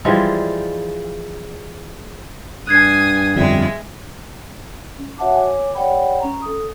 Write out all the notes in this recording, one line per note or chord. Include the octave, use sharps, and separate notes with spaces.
E3 F3 G3 G#3
G2 G#5 D#6 F#6 G#6 C7
G1 F2 G3 G#3 E5
C#4
F#4 C#5 E5 F#5 A5 D6
C#5 G#5 D6
G4 C#5 D5 F#5 G5 B5
C#4 A#5
A4 D#6